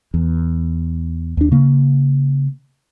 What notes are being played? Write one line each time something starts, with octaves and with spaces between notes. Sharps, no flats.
E2
D#2 D4
C#3 A#3